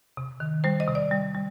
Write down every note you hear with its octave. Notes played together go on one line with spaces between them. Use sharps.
C3
D#3
G3 C5
D#5
C3
D5
G3
G3